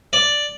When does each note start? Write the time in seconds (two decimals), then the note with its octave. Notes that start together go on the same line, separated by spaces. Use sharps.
0.13 D5